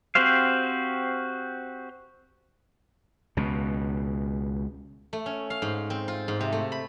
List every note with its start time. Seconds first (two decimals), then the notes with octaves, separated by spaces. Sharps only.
0.15 C4 F#4 G4 C5 F5
3.37 C#2 B2
5.13 A3
5.26 C#4
5.50 F5
5.62 G#2
5.90 C4
6.08 F4
6.28 G#2
6.41 C3
6.52 A3
6.72 B5